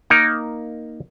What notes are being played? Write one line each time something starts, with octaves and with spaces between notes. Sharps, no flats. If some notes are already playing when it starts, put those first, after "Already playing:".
A#3 D#4 A#4